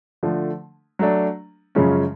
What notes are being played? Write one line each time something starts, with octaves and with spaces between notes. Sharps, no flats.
D3 F3 A3
F#3 A3 D4
F#2 C#3 F3 G#3 C#4